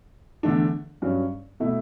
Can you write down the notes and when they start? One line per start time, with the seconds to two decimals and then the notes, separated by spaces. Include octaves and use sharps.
0.43 E2 D3 A3 D4
1.02 G2 F#3 C#4
1.60 B2 A3 E4